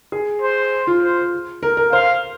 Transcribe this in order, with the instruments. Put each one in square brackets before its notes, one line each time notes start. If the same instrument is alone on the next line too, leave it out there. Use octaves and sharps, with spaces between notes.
[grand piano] G#4
[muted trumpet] C5
[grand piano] F4
[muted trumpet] C5
[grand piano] A#4
A#4
[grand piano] C5 [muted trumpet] F5